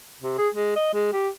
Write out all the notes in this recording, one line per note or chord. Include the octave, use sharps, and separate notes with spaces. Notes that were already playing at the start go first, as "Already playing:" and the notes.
C3
G#4
G#3
D#5
G#3
G4